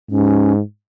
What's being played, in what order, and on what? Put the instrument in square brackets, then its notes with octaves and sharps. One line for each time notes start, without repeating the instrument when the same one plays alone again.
[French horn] G#2 [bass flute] C#4